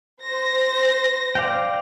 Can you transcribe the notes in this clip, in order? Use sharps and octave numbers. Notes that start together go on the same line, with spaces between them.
C5 A#6
D5 F5 G5